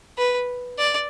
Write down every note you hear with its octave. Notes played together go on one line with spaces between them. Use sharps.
B4
D5